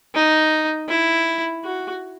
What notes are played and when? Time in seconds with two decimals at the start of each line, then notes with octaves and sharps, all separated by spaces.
0.15 D#4
0.89 E4
1.64 F#4